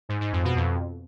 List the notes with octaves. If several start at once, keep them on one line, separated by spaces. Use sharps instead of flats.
G#2
G#2
F2
B2
F2